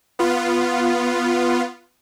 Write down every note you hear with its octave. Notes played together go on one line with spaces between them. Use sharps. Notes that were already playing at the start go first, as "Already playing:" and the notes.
B3 F4